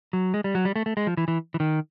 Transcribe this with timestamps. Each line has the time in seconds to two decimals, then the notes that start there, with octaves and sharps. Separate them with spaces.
0.13 F#3
0.34 G#3
0.44 G3
0.55 F#3
0.65 G3
0.76 A3
0.86 A3
0.97 G#3
1.07 F3
1.17 E3
1.28 E3
1.54 E3
1.60 D#3